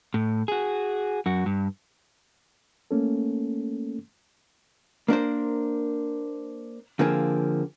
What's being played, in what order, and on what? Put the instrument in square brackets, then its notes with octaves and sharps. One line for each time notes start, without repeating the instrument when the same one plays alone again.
[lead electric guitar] A2
F#4 G#4
F#2 F#4
G2
[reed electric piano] A3 A#3 C#4 A4
[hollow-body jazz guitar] A#3 D4 A#4 C5
D3 F3 A#3 C4 G#4